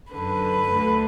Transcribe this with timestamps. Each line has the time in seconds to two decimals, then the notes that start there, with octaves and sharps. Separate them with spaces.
0.11 F#2 D3 B4
0.70 D2 D3